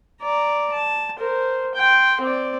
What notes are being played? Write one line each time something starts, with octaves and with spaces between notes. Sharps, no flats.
D5 A#5
A5
A#4 C5
G5 C6
C4 D5